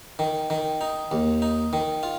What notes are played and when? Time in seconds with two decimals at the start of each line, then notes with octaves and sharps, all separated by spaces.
0.19 D#3
0.50 D#3
0.81 D#4
1.11 D#2
1.42 D#4
1.73 D#3
2.03 F4